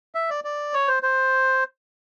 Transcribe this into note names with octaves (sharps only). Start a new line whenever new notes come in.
E5
D5
D5
C#5
C5
C5